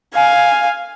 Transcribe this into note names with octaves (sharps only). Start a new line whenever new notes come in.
F5 G#5